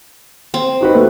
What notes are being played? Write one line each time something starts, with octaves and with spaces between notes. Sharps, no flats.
C4
D#4 F#4 B4
A3 A4